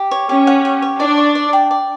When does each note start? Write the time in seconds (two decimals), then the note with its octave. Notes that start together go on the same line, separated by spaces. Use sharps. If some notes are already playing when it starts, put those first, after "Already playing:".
Already playing: G4
0.11 C#5
0.29 C#4 G4
0.47 F#5
0.65 G4
0.82 C#5
1.00 D4 D5
1.18 C#6
1.35 D5
1.53 G5
1.71 D5